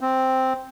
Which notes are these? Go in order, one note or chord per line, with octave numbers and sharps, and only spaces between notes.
C4